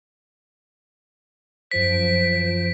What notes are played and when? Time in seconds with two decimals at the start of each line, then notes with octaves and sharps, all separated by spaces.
1.71 F#2 F3 C5 B6 D7